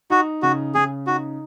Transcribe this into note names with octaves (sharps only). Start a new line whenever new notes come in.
D#4 F#4
C#3 F#4
C#3 G#4
D#4 F#4